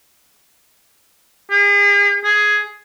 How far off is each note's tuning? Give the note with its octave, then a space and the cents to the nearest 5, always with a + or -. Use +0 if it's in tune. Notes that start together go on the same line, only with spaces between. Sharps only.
G#4 -45
G#4 +10